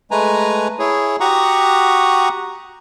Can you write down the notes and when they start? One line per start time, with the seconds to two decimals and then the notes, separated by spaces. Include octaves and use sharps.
0.11 G#3 A3 B4 G#5 A#5
0.79 E4 G#4 C#5
1.20 F#4 G4 F#5 A#5 C#6 D#6